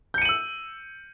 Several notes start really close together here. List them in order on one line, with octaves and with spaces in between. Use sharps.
G6 C#7 D#7 F#7 E6